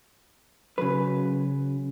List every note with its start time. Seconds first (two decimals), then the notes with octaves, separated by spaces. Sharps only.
0.78 C#3 F#3 B4